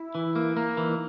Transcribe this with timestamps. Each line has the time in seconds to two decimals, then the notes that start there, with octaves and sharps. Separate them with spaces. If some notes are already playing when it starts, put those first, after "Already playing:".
Already playing: E4
0.15 E3
0.36 A#3
0.57 A#3
0.77 E3 D#4